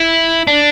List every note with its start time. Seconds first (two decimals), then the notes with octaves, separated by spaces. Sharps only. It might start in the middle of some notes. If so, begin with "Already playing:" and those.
Already playing: E4
0.47 D4